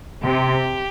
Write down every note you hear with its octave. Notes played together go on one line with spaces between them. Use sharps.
C3 G4